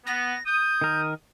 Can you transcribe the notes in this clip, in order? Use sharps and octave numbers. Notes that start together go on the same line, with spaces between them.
B3 A#6
D#6 G6
D#3 A#4